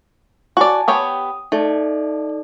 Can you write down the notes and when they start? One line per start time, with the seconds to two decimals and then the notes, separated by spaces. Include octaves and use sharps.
0.57 F#4 D5 G#5 A5
0.88 B3 G4 C#5 D#6
1.52 A3 D#4 A4 D5